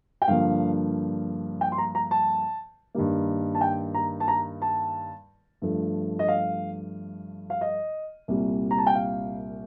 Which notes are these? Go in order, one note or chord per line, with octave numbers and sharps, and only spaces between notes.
G5
G2 D3 F3 A#3 F5
G5
C6
A#5
A#5
A5
G2 D#3 G3 A#3
A5
G5
A#5
A5
A#5
A5
G2 F3 A3
D#5
F5
F5
D#5
C2 A#2 G3
A#5
A5
G5
F5